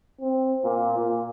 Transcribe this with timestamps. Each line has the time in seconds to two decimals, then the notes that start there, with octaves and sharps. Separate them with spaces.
0.21 C4
0.64 A#2
0.98 A#2